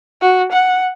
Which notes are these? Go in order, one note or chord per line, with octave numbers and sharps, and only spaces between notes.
F#4
F#5